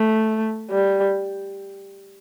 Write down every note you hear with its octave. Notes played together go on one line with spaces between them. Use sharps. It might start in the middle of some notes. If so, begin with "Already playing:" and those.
Already playing: A3
G3